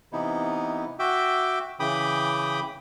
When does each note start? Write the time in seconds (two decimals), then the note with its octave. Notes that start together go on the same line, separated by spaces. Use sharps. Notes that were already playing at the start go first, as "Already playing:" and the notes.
0.12 C3 E3 B3 D#4 E4
0.99 F#4 E5 G5 D6
1.80 C#3 E3 G5 B5 D6 D#6